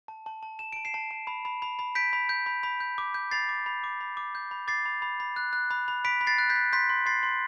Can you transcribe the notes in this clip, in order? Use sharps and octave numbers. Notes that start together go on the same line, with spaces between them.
A5
A5
A5
A5 E7
A5 D7
C7 E7
A5
A5
B5
B5
B5
B5
G6 B6 D7
B5
G6
B5
B5
G6
D6
G6
B5 A6 C7
D6
B5
D6
B5
D6
G6
B5
D6 A6 C7
B5
B5
B5
F#6
F#6
B5
B5
B5 B6 D7
B5
A6 C7
F#6
G6 B6
F#6
C6 G6 B6
C6
C6 A6 C7
C6